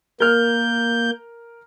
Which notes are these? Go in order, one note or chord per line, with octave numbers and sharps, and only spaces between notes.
A#3 A#4 F6 G6